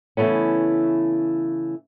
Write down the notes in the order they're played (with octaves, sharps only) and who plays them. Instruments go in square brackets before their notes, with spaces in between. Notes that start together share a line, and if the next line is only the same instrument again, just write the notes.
[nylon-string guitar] C#3 E3 F3 A3 B3 C#4